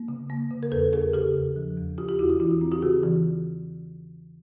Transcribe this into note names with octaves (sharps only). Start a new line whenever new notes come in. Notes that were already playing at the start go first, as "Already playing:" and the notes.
Already playing: A#3
C#3
A#3
C#3
A#4
E2 A4 B4
E2 G#4 A#4
C#3 G4 A4
E2
F3
E2
E2 F4 G4
F4 G4
E2 E4 F#4
F4
E3 E4
F4
C4
F4 G4
C#3 F#4 G#4
E3